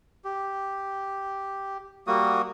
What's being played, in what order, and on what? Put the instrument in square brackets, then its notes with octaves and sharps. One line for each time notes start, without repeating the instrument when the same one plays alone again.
[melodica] G4
G3 A#3 F#4 D#6